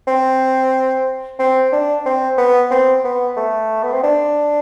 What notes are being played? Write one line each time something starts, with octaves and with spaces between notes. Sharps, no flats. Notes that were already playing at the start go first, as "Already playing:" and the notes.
C4
C4
D4
C4
B3
C4
B3
A3
B3
C4
D4